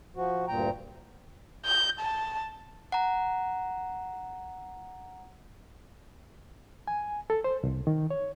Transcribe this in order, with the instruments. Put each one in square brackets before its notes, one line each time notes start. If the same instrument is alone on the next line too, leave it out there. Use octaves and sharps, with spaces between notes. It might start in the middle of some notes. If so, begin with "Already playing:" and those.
[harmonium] F3 F#4
D2 G2 A#2 G5 A#5
[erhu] G6
A5
[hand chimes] F#5 A#5
[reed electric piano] G#5
A4
C5
C2
D#3
C#5